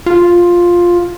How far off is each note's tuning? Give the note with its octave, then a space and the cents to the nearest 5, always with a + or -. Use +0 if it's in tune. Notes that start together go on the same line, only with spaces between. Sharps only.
F4 +5